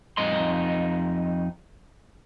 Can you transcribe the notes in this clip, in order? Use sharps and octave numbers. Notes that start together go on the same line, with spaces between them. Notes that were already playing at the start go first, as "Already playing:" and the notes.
F2 D#4 D#5 C6